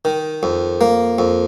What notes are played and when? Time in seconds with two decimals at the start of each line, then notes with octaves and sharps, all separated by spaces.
0.05 D#3
0.43 F2
0.81 A#3
1.19 F2